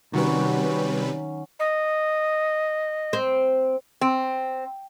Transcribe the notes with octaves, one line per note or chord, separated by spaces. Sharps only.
C3 D#3 F#3 G3 C#4 F#4 B4
D#5
C4
C4